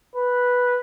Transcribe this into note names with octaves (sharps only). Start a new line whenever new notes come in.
B4